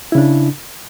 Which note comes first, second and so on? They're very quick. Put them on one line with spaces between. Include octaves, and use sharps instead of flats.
E4 C#3 D4